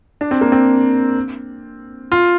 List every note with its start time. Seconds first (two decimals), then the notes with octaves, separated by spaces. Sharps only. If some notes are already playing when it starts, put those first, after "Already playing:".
0.21 D4
0.31 C4
0.41 A#3
0.52 C4
2.12 F4